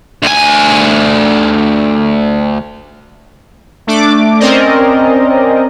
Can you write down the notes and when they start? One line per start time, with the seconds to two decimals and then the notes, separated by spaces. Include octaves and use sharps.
0.22 D2 G#5
3.87 A3 D4 D6
4.40 C4 C#4 A#4 C5 D5 D#5